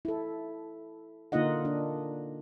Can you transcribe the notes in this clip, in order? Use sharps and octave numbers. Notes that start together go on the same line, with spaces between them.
E4 A4
D3 A#3 D#4 F4 D#5 F#5
D4